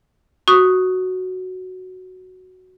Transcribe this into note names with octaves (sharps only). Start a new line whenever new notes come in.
F#4 C#6 D#6